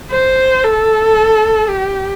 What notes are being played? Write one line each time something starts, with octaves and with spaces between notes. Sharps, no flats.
C5
A4
G4